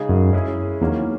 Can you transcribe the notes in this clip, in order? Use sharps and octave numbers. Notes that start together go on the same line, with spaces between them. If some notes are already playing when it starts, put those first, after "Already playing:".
Already playing: C#3 G#3 D#4 G#4
F#2
G#3 C#4 E4 G#4
E2 D#3 F#3 A#3 C#4